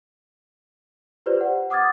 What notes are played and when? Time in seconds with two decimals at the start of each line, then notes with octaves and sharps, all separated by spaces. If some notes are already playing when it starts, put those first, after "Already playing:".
1.26 F4 G4 B4 C5 D5
1.41 F#5
1.70 F#5 D6 D#6 F6 G#6 A6